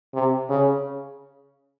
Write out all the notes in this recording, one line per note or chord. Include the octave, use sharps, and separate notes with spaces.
C3
C#3